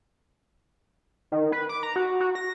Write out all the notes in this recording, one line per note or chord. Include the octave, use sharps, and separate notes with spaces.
D#3
B4
D6
A#5
F#4
F#4
A#6